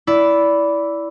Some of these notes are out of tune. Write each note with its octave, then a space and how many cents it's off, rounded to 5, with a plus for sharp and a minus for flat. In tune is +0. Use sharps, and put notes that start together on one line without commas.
E4 +0 D5 -20